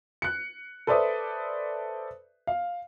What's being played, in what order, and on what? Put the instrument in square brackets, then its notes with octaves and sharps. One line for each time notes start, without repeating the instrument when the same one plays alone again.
[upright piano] F#6 C#7
A4 B4 C5 D5 E5 D#6
F5